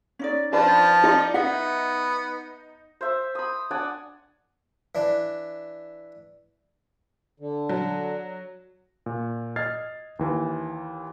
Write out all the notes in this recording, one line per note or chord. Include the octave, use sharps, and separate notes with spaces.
C#4 D#4 D5
F3 D4 B4 C5 A5
D#4 D5
B3 D#4 E5 F#5
C5 E5
B5 D#6
D4 D5 F#5 G#5
E3 D4
D3
F#3
A#2
D#5 F6 G#6 A6 C7
D#2 E3